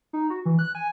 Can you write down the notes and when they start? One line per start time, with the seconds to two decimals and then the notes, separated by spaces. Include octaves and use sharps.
0.13 D#4
0.30 F#4
0.45 E3
0.59 F#6
0.75 G#5